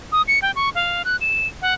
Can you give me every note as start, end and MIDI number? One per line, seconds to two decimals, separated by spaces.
0.12 0.22 87
0.28 0.39 97
0.42 0.51 79
0.56 0.69 85
0.75 1.03 77
1.05 1.16 90
1.21 1.47 100
1.62 1.74 78